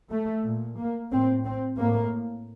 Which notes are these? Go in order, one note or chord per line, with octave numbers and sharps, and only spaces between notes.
A3
A#2
A#3
A2 C4
C4
A2 A#3